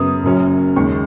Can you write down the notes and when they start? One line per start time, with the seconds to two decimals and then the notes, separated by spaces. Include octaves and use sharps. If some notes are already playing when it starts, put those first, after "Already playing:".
Already playing: F#2 C#3 B3 D#6
0.23 F#1 F#2 F#3 C#4
0.76 D#2 C#3 G#3 C#4 C#6